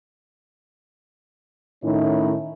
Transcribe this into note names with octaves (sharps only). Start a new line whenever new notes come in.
A2 D#3 C#4 D#4 E4